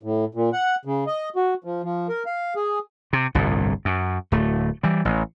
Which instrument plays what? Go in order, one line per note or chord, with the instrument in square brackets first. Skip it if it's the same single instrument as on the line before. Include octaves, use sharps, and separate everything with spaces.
[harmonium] A2
A#2
F#5
C#3
D#5
F#4
F3
F3
A#4
F5
G#4
[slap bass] C3
G1 C2 A2
F#2
D1 A3
E3 G3
A1